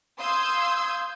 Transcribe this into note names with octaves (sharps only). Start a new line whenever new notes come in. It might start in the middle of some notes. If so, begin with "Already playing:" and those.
F5 C6 D#6 E6 G6 G#6